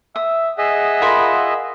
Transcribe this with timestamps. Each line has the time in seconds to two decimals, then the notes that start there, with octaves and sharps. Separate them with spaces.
0.16 E5 D#6
0.58 G#4 D#5 E5 F#5
1.02 F4 A#4 B5